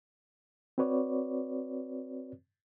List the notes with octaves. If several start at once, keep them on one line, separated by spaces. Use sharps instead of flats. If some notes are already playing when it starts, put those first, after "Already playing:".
C4 F#4 B4 C#5 D5